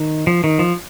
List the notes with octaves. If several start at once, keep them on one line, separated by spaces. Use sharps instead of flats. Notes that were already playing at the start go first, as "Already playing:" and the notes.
Already playing: D#3
F3
D#3
F3